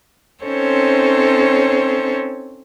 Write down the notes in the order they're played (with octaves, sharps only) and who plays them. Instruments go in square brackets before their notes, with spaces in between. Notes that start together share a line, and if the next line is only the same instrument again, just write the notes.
[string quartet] C4 C#4 D#4 A4 C5 C#5